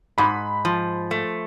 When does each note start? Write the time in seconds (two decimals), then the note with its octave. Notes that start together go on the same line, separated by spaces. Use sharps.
0.18 G#2 B5
0.65 F3
1.11 A3